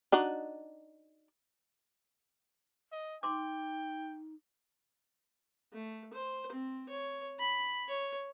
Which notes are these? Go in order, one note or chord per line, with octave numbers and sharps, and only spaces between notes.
D4 D#4 F#4
D#5
D#4 G5 C6 D6
A3
C5
C4
C#5
B5
C#5